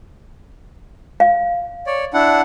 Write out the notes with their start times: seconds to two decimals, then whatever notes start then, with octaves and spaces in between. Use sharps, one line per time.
1.20 F5
1.87 C#5 D5
2.14 D4 E4 F#5